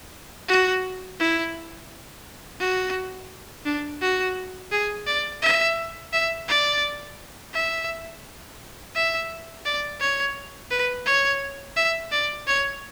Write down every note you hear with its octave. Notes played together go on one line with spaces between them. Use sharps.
F#4
E4
F#4
D4
F#4
G#4
D5
E5
E5
D5
E5
E5
D5
C#5
B4
C#5
E5
D5
C#5